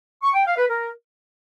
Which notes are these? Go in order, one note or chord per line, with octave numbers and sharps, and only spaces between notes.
C#6
G5
F5
B4
A#4